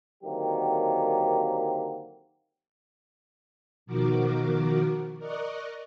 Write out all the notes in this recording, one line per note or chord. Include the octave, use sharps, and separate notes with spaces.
D3 D#3 F#3 A#3 C4 G4
B2 D#3 F3 F#4 A#4 D6
A#4 D5 D#5 C#6 F#6